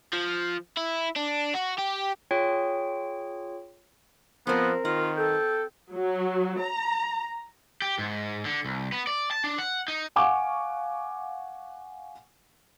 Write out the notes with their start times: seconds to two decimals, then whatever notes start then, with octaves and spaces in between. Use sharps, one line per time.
0.13 F3
0.77 E4
1.16 D4
1.54 F#4
1.78 G4
2.31 F4 G#4 C#5 G5
4.47 F3 B3 C4 A#4 C5
4.85 D#3 F4 F#5
5.17 A4 G5
5.93 F#3
6.59 A#5
7.82 G4
7.99 G#2
8.45 D3
8.65 C2
8.92 B3
9.07 D5
9.31 A5
9.44 D4
9.58 F#5
9.88 D#4
10.16 F5 F#5 G#5 C#6 D6